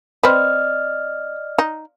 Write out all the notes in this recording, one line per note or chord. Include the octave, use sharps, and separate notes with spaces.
C4 B4 D5 D#5 F6
D#4